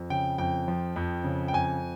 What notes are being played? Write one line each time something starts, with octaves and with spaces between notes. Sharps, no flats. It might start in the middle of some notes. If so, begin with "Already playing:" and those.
Already playing: F2
C#3 G5
F2 G5
F3
F2
C#3
G5
F2 G#5